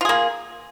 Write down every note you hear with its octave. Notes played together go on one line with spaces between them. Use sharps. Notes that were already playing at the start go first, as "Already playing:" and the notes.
A#3 F4 G#4